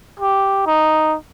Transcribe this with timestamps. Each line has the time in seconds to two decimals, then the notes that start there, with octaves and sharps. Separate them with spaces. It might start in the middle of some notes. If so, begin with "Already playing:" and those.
0.20 G4
0.66 D#4